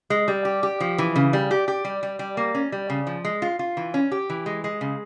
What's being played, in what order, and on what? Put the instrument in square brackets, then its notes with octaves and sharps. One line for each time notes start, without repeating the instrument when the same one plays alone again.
[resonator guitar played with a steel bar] G#3
G3
G4
G4
F3
E3
C#3
G3
G4
G4
G3
G3
G3
A#3
C#4
G3
C#3
F3
G#3
F4
F4
E3
C#4
G4
E3
G#3
G#3
C#3